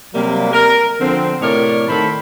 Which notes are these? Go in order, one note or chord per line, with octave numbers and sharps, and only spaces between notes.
C3 F#3 G3 A#3
A#4
D3 F3 C4
A2 C3 A#4 C#5 D5
A2 D#3 A4 C5 B5